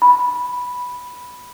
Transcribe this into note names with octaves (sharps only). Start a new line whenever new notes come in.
B5